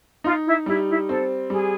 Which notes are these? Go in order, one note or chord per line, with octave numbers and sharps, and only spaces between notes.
D#4 F4
E4
G3 E4
E4
C4 A4
G3 G#4